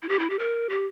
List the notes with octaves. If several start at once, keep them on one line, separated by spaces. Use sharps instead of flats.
E4
G4
E4
G4
A#4
G4